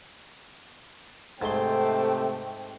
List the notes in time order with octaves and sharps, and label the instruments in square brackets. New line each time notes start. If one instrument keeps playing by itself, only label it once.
[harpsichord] G#2 C6 [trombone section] C3 C4 C5 [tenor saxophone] A3 [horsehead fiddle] G5